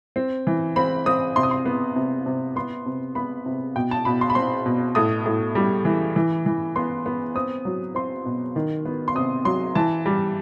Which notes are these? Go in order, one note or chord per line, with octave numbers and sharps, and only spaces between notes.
C4
E3
C4 B5
C4 D#6
C3 C6
D#6
C6
B3
C3
C3
B3 C6
C3
B3 B5
C3
B2 G5
A5
B2 B5
C6
B5
C4 C6
B2
A2 D#6
A2
G3
E3
E3
E3
B3 C6
B3
C4 D#6
F#3
C4 C6
B2
D#3
B3
C6
C3 D#6
F#3 C6
E3 A5
G3